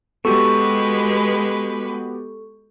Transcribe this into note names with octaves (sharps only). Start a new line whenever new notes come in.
G#3 B3 F#4 G4 A4 B4 C#6